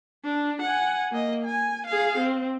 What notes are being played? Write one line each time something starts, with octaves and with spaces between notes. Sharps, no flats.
D4
F#5 G#5
A#3 D#5
G#5
G#4 F5
C4